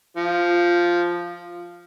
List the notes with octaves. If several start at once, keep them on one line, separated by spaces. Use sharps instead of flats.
F3